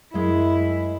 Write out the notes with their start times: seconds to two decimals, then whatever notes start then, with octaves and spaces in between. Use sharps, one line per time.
0.14 F#2 G#3 E4 E5